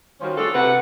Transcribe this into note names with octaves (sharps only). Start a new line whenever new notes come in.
D#3 G3 C#4 F4 F#4 C5
D4 F4 F#4 G#4 A4
C3 B4 F#5